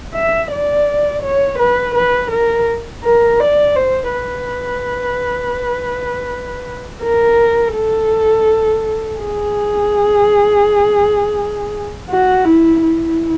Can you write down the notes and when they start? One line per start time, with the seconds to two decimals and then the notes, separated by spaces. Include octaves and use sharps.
0.14 E5
0.51 D5
1.22 C#5
1.59 B4
1.95 B4
2.31 A#4
3.04 A#4
3.40 D5
3.76 C5
4.13 B4
7.02 A#4
7.74 A4
9.19 G#4
12.09 F#4
12.45 E4
12.82 E4